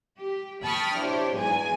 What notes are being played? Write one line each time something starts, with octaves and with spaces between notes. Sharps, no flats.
G4
G5 A5 B5 C#6 D#6 F6
D4 E4 G4 C5 C#5
B1 E2 G#2 G#4 G#5